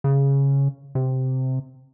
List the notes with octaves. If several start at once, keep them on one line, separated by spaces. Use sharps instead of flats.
C#3
C3